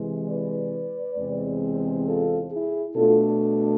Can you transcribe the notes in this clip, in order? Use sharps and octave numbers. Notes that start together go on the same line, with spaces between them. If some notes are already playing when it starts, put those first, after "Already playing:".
Already playing: C3 E3 G#3
B4 D5
E2 C3 G#3 C4
F4 A4
E4 G#4
B2 A3 D4 F4 A4